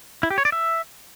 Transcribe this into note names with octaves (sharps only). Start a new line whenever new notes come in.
E4
G4
C#5
D5
E5